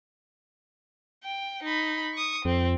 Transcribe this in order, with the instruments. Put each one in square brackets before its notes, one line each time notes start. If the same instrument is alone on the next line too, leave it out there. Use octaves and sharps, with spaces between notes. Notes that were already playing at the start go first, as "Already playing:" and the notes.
[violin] G5
D#4 B5
C#6 D#6
[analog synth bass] F2 [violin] C4